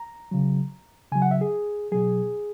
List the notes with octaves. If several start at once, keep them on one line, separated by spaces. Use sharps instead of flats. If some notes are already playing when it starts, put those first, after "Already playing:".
Already playing: A#5
C#3 F#3
C#3 F#3 G#5
F#5
E5
G#4
B2 F#3 G#4